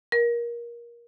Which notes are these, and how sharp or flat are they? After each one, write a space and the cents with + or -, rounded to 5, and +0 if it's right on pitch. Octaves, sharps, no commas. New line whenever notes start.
A#4 +20